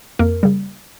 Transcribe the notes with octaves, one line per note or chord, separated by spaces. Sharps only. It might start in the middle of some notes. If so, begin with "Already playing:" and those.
F2 A#3 A#4
C#3 G3